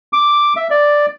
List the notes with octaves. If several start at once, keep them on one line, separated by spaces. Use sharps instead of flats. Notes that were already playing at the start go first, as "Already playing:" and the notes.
D6
E5
D5